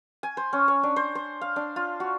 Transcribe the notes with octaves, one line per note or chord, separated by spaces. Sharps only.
G#5
C5
C#4
C#5
D4
C5
C5
F5
D4
F4
F#4